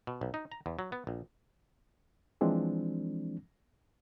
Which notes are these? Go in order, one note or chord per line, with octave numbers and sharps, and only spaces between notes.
B2
B1
D#4
A#5
E2
F#3
B3
A#1
E3 F3 G#3 C4 D4